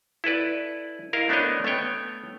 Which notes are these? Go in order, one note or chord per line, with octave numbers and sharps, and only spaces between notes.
E4 A4 B4 D5
E4 A#4 D#5 F5
A3 B3 D4 C5 C#5 D#5
A3 B3 C#5 G5